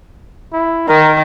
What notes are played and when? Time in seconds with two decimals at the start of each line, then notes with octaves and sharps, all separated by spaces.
0.53 E4
0.88 D#3 A#4